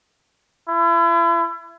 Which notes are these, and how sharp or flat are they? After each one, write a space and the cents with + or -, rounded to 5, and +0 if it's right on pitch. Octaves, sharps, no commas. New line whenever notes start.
E4 +35